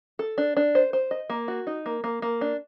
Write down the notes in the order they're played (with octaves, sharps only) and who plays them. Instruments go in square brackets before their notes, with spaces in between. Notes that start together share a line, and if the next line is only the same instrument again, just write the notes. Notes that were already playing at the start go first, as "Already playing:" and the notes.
[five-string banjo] A4
D4
D4
C5
C5
D#5
A#3
F#4
D#4
A#3
A#3
A#3
D4